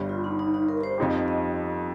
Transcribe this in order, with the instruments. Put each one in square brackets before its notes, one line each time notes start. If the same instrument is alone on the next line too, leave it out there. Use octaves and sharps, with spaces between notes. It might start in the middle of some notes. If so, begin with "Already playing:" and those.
Already playing: [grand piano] G1 G2 G3
[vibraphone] F4
D#4
D#4
D#4
A#4
C5
[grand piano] F2 F3 D#4 G4
[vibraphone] D#5